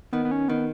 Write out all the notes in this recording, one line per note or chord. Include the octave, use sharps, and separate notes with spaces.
D#3 B3
B3
C#4
D#3 B3